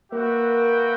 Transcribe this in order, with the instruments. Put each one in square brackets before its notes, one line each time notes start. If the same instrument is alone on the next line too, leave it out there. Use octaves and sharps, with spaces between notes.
[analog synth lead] A#3 [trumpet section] F#4 B4 E5 G5